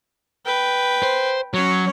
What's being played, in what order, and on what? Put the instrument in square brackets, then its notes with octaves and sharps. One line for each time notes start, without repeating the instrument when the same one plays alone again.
[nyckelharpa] B4 G5
[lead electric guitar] C5
[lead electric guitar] F#3 [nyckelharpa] C#4 C#5